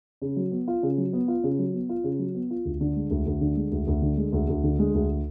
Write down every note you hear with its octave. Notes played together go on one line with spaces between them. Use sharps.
C#3
F#3
B3
F4
C#3
F#3
B3
F4
C#3
F#3
B3
F4
C#3
F#3
B3
F4
D2
D3
G#3
D2
D2
D3
G#3
D2
D2
D3
G#3
D2
D2
D3
G#3
D2